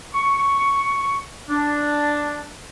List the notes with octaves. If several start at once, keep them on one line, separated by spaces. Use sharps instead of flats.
C#6
D4